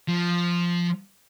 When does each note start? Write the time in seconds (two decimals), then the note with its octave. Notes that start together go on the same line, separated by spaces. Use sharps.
0.08 F3